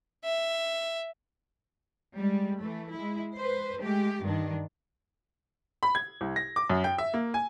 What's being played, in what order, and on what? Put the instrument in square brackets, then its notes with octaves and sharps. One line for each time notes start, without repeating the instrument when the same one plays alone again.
[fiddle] E5
[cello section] G3 G#3
E3 A3
G#3 E4
B4 C5
G#3 A3 G4
G2 D#3 D4
[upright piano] B5
G#6
C2
A#6
D6
F#2
G5
E5
A#3
G#5